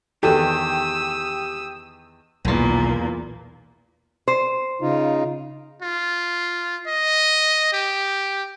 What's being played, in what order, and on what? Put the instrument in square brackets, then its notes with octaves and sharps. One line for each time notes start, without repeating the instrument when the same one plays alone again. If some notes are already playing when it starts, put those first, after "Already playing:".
[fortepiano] E2 D#3 [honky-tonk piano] G4 [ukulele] A4 B4 [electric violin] D#6 E6
[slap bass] B1 D#3 [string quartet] E2 A#2 A#3
[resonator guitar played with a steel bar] C5
[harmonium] C#3 D#4 F4
[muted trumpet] F4
D#5
G4